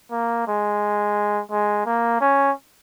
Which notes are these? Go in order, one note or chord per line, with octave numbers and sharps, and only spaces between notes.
A#3
G#3
G#3
A#3
C#4